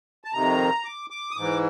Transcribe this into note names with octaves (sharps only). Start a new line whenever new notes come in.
A5
F2 C3 D#3 A#5
D6
D6
D#6
G#2 E3 D6